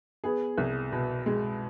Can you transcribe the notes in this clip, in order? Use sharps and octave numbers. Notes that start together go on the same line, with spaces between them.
B3 G#4
C2
B2
G#3